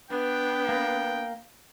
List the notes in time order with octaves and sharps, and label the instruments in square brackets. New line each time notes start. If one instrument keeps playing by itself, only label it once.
[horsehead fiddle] B3 D4 [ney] B4 [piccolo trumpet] G5
[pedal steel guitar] A#3